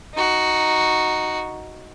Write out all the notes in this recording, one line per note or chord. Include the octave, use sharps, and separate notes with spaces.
D#4 F#4